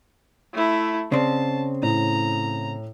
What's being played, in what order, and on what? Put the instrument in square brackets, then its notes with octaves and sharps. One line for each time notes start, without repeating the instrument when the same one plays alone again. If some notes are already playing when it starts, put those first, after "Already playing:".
[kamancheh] A3 E4
[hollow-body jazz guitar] C#3 C4 [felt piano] D5 [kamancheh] A5
[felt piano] A2 [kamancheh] A#5